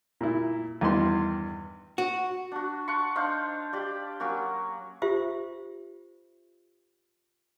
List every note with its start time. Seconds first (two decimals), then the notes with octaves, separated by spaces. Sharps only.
0.21 A#2 E4
0.81 E2 G2 D#3 B4 C6
1.98 F#4
2.52 D4 F#4
2.88 F#5 A5 C6 C#6
3.16 D4 D#4 C5 F5
3.73 G4 D5 G5
4.20 F#3 A#3 C#4 F#4
5.02 F4 G4 C5 E5